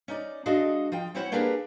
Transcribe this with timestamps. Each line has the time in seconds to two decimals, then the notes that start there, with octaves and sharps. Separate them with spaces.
0.08 C#4 D#4 D5
0.46 G#3 D4 F#4 A4 D#5 F5
0.92 F3 F4 G5
1.15 C4 C#4 E4 C5 C#5 F#5
1.32 A#3 D4 G4 G#4 A#4 B4